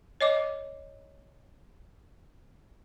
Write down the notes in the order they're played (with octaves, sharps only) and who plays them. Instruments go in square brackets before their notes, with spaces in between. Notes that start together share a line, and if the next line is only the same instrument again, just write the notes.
[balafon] C#5 D#5 D6